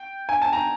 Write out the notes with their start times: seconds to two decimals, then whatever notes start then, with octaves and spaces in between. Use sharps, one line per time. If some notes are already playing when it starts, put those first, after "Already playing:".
Already playing: G5
0.29 G#5
0.42 A5
0.53 A#5